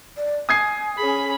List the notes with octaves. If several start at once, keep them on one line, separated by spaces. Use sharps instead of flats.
D5
G#5 D#6 G#6 C7
C#4 G#4 B5